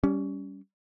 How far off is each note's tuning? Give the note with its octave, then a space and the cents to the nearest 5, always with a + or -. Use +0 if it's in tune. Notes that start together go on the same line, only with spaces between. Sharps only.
G3 +0 C#4 +20